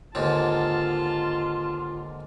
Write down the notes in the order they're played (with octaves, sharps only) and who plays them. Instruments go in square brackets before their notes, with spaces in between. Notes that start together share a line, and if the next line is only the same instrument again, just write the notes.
[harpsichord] D#2 G#2 D3 [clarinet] F4 [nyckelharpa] A5